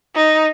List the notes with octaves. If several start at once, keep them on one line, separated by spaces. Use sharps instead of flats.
D#4